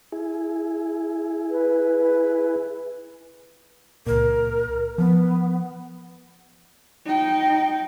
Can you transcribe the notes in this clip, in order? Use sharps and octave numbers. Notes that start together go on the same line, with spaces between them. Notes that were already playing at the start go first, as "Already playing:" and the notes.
E4 G#4
B4
C#2 A#2 A#4
F3 B3
D#4 G5